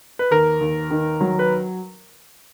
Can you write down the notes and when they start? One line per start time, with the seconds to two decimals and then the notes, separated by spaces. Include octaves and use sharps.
0.19 B4
0.31 D#2 A#4
0.61 D#2
0.91 D#3
1.21 F#3
1.39 B4